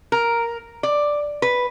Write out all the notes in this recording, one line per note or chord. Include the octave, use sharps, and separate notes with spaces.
A#4
D5
B4